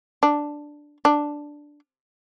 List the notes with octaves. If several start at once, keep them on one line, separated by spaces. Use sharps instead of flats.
D4
D4